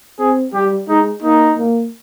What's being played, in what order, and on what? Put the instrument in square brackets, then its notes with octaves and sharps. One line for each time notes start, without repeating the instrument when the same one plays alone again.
[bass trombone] C4 [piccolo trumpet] G#4
[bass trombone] G3 [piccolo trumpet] G4
[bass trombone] G#3 [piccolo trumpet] D#4
[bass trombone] A#3 [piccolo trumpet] D#4
[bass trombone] A#3